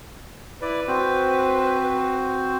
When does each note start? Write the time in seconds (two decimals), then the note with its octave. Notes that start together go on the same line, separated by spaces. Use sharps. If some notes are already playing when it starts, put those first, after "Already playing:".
0.62 E4 B4 D5
0.88 C4 F#4 C5